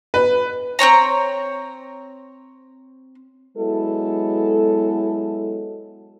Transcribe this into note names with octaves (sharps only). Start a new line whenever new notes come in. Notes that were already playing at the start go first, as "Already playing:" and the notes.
B4
C4 C#4 C#5 A#5
F#3 G#3 B3 E4 A4